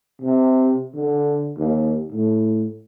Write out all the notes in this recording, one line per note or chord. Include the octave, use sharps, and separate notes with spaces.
C3
D3
D#2
A2